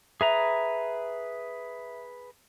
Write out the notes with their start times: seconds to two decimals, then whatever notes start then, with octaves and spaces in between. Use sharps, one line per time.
0.21 G#4 B4 E5 A#5